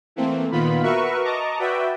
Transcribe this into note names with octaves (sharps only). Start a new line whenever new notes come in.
E3 A3 A#3 C4
A#2 D#3 B3 F4 B5
F#4 A#4 B4 E5 C#6
D#5 A5 A#5 C#6 D6
F#4 B4 D5 E5 G5